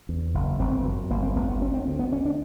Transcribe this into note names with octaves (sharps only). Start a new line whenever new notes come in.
E2
F#1
G1 C4
F#2
G1 A#3
C4
G1 B3
B3
D2 C#4
C4
D2
B3
D2 C#4
D4